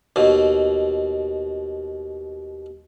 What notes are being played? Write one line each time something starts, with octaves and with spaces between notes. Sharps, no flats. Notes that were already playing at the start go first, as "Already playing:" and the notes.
D#2 B2